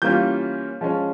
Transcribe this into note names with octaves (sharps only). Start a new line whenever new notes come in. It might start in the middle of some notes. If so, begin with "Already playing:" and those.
E3 G3 A#3 C#4 F4 G6
F3 G#3 C#4